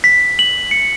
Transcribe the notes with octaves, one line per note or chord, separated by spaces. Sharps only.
B6
F#7
C#7